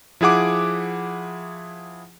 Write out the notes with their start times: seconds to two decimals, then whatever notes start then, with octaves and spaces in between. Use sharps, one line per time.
0.21 F3 E4 G#4 F#5 D6